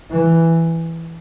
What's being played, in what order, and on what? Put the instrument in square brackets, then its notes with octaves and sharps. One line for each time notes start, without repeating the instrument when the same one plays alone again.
[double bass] E3